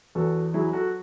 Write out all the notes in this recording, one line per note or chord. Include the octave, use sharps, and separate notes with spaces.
E2 F#4 A4
F#3 E4 G#4
F#4 A4